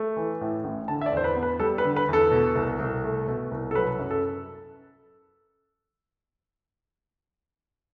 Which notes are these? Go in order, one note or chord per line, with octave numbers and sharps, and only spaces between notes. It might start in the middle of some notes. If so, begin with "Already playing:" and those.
Already playing: A3
E3
A2
A1
D3 A5
E5
D5
E2
C5
B4
B3
B4
G3 A4
B4
D3
B4
E2 A4
B2
C2
C2
A3
B2
C2
A4
F#3 B4
F#2
A4